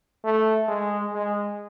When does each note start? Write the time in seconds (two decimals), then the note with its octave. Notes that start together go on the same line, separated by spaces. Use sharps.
0.24 A3
0.68 G#3
1.13 G#3